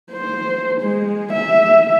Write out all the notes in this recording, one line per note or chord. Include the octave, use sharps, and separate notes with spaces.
C5
G#3
E5